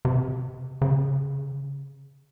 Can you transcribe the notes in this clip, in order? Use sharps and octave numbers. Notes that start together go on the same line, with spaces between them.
C3
C#3